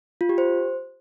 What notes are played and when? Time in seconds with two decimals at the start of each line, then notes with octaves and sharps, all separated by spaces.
0.21 F4
0.29 G4
0.38 C5